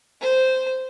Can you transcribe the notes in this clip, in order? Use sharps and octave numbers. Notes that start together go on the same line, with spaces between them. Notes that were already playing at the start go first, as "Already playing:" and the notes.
C5